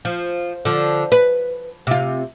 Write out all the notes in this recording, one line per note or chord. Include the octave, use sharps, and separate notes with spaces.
F3
D3 F3
B4
C3 F4